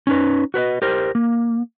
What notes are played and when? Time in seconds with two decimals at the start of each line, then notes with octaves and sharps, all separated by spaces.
0.07 C#4 D#4 B4
0.54 F#4 B4 C5 D#5
0.82 G4 A#4 C5
1.15 A#3